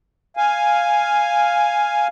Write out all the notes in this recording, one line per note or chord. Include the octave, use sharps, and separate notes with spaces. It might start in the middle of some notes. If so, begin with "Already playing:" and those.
F5 G#5